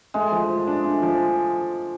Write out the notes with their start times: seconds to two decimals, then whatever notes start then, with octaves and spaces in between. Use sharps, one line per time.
0.14 G#3 A3
0.32 F3
0.49 F3
0.67 D4
0.84 A3
1.02 F3